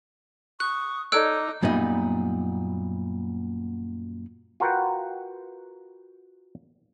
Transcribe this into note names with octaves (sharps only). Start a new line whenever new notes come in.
C#6 D#6 F#6
D#4 A4 C#5 D5 D6 E6 F#6 D7
F#2 A#2 G3 B3 D#4
F4 F#4 A#4 B4 F#5 G5